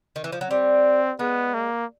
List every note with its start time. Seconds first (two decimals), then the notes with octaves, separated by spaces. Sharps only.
0.16 D#3
0.24 E3
0.32 F3
0.41 F#3
0.50 G3 C4
1.19 G#3 B3
1.54 A#3